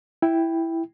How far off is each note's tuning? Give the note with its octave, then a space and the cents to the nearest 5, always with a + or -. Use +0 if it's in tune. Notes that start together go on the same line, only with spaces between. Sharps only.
E4 +0 G5 +0